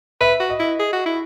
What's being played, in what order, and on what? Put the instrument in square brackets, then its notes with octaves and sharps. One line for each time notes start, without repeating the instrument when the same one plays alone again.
[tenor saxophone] B4 [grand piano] E5
[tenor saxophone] F#4
[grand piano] D#5
[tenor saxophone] E4
G#4
F#4
E4